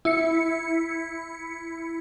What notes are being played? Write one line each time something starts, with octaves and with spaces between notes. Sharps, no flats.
E4 C#7